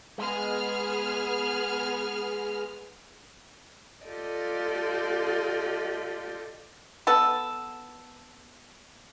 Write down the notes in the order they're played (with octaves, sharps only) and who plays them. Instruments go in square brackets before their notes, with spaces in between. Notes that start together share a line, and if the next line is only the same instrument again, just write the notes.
[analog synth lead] G#3 [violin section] B3 G#4 F6
[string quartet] F4 G4 A4 D5 D#5
[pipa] B3 A4